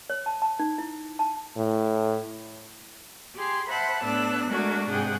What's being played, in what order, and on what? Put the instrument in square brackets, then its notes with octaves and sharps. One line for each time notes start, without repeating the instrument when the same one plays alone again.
[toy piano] C#5
A5
A5
D#4
E4
A5
[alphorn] A2
[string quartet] G4 G#4 C6
C5 E5 F#5 A5 B5 F#6
A2 B3 D4 E6 F#6
G#3 A3 D4 F#4 A#4
G#2 C3 G#4 F#5 G5